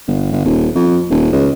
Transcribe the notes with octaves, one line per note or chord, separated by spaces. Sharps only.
G1
G1
D#1
F2
D#1
C#2